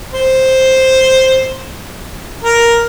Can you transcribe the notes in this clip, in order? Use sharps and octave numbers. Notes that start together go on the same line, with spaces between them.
C5
A#4